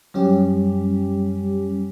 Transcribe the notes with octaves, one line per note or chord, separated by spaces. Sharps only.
F#2 G3 C#4 G4